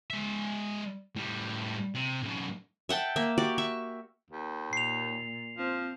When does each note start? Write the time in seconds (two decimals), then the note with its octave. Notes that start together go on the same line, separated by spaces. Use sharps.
0.10 G#3 E5
1.16 A2 G3
1.94 C3
2.22 F#2 A2
2.89 E5 F#5 G5 A5
3.16 A#3 E5
3.38 F#4 G4 D5
3.58 E5 C#6
4.31 D#2
4.73 A#2 C7 F7
5.57 F3 C4